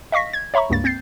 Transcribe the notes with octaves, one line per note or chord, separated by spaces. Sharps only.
D#5 F5 C#6 A#6 B6
G#6
C#5 E5 A#5 B5 C#6
C#2 G2 A#3 A6
C4 G6 A6 C7